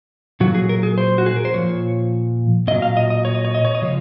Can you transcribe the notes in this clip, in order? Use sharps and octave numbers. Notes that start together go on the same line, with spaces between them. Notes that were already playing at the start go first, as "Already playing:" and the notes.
A#2 F#3 F#4
G#4
A#4
G#4
C5
F#4
G#4
A#4
C5
A#2 F3 C#5
A#2 F#3 D#5
F5
D#5
D#5
C#5
D#5
C#5
D#5
C#5
D#5
C#3 F3 G#3 C#5